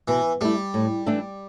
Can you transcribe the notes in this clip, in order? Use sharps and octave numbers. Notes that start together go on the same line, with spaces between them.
B2 E3
G3 A3 E4
A2
E3 A3 D4 A4